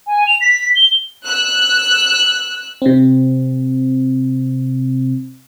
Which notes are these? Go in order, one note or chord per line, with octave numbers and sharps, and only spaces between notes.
G#5
F7
B6
G7
E6 F#6
C3 C4